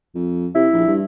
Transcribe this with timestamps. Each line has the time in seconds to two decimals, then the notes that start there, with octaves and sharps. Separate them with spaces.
0.15 F2
0.55 C3 E4
0.73 A#1
0.87 G2